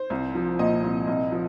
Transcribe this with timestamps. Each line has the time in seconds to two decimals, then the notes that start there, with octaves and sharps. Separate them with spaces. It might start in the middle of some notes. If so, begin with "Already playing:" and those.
Already playing: C5
0.10 C2
0.35 F3
0.59 A#2 D#5
0.84 C2
1.07 C2
1.32 F3